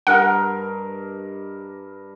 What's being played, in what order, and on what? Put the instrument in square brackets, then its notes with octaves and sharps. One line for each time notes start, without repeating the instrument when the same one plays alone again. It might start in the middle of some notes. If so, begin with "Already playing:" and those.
[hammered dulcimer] G2 A#4 D#5 [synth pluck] F#5